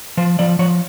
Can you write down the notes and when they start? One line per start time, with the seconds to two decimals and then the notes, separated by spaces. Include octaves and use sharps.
0.17 F3 C5
0.39 F3 D5
0.59 F3 C#5